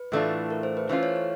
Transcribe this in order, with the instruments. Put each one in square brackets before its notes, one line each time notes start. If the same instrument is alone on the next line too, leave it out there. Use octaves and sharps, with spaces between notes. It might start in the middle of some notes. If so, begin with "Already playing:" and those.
Already playing: [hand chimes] B4
[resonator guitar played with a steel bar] A2 E3 A3 D4 F4
[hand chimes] A#4
C5
B4
[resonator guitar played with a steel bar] E3 A3 C#4 F4 [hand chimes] C5
[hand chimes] C#5
C#5